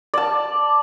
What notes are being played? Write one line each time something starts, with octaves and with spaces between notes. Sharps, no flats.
D5 A5